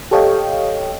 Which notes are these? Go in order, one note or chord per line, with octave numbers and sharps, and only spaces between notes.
G4 A4 C#5 D#5 F5 G5